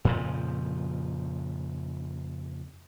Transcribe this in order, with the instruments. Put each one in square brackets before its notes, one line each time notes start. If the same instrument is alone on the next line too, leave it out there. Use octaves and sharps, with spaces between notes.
[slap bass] F2 A#2 C#3 F3